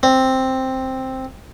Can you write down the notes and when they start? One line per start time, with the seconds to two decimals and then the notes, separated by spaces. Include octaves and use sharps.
0.03 C4